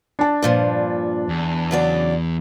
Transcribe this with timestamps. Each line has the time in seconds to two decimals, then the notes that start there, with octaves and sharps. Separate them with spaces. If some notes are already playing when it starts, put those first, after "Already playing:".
0.19 D4 A5
0.42 G2 A#2 F3
1.29 E2
1.71 C#3 F#3 D5